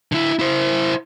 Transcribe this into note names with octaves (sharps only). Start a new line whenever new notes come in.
D3 E4
E4 C5